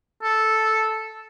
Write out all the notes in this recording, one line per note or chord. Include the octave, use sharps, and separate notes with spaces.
A4